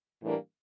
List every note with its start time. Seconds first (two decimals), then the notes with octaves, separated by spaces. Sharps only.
0.22 A2 E3 G3 A#3 D4